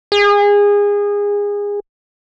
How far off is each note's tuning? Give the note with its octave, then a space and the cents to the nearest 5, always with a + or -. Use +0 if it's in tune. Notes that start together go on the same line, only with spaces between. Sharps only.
G#4 -25